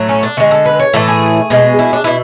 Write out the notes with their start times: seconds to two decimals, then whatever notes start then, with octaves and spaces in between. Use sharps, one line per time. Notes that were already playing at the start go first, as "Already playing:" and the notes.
Already playing: A2 F#3 A3
0.09 C#4
0.23 D4
0.37 D3 G#3 F#4
0.51 A4
0.66 B4
0.79 C#5
0.93 A2 E3 A3 A4
1.08 G#4
1.50 B2 G#3
1.79 E4
1.93 D4
2.04 B2 E4